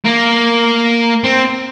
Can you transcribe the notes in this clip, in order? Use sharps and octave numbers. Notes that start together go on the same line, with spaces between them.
A#3
C4